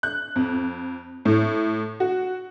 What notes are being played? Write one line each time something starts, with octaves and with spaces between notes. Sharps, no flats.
F#6
F2
A2
F#4